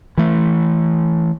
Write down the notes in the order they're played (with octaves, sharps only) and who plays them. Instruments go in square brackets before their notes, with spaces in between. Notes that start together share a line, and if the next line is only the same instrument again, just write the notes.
[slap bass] E3 A3